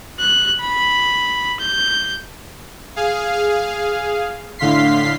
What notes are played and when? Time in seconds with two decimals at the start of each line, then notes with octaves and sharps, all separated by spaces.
0.19 F#6
0.61 B5
1.60 G6
2.96 G#4 F5
4.59 A2 D3 F5 C6 B6 C7